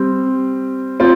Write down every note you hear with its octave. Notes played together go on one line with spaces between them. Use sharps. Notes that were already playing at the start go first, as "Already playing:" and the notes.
Already playing: G3 C4
C4 F4